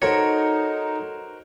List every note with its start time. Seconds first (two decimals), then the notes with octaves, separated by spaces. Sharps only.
0.02 D#4 F#4 A4 A#4 C5 C#5 A#5 A#6